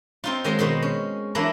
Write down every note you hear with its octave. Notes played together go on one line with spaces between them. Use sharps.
C4 D#4 F4
D#3 F#3 G#3 G#4 G#5 C6
B2 D#3 G#3 C6
C#4
E3 F#3 A#3 D4 E4 A#5